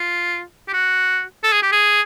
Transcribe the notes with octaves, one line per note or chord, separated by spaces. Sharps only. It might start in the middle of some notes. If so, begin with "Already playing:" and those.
Already playing: F4
G4
F#4
A4
G#4
G4
G#4